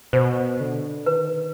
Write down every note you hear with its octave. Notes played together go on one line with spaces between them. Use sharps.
B2 C5
D3
D#3 B4